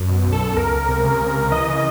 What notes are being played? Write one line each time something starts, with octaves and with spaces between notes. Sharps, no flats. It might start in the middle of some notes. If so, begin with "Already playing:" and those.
Already playing: F#2
B2
B1
A4
B1
C#2 A#4
C#2
C3
C#3
C#2
C#2
E3 D#5
C#3